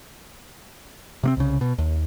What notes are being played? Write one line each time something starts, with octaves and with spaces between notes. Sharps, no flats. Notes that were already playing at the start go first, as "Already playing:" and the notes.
C3 A#3 C4
C2 C#3
B2
D#2